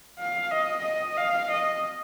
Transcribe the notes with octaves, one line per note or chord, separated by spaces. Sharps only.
F5
D#5
D#5
F5
D#5